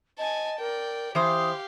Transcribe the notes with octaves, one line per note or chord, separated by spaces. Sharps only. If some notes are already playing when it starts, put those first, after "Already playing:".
D#5 G#5 A5
A#4 D5 G5
E3 G4 C5 F5 D#6